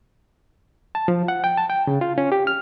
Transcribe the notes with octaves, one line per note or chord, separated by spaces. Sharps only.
A5
F3
F#5
G5
A5
G5
C#3
F4
C#4
G4
F6